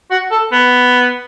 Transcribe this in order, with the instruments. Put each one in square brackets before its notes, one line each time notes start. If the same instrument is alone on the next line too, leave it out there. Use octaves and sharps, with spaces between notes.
[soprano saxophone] F#4
A4
B3